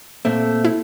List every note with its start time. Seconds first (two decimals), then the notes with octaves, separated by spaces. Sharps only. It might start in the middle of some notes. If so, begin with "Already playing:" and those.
0.25 A#2 A3 C4
0.65 E4